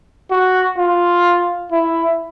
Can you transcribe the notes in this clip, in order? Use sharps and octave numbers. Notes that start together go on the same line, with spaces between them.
F#4
F4
E4